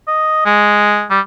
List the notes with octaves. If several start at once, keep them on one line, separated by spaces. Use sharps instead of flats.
D#5
G#3
G3